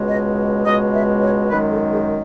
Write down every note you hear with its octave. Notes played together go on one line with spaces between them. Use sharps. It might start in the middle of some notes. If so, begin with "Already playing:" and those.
Already playing: C#2 B2 G#3
D#5
C#2 B2 G#3 D#5
E5
C#5
F#2 D#3 G#3 B4
A4
G#4